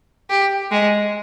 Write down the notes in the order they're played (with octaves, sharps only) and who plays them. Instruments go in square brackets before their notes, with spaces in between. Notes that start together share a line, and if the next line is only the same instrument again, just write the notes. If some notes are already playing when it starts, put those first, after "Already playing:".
[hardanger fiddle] G4
G#3